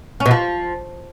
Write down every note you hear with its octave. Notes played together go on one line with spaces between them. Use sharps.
C#4
B2
F3